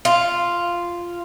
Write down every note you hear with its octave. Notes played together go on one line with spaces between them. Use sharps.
F4